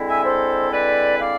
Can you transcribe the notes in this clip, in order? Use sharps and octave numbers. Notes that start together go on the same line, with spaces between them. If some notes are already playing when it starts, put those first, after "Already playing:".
Already playing: D3 G#3 C4 E4
E5 G#5
A4 C5
B4 D5
D5 F5